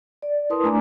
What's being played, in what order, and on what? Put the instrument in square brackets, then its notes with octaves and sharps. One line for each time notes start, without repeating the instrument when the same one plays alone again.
[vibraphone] D5
E4 A#4 B4 A5 C6 D#6
A3 D4 D5 G#5 A#5 D6